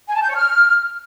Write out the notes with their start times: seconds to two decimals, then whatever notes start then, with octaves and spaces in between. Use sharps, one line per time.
0.08 G#5
0.15 A5
0.22 G6
0.29 C#5
0.35 F6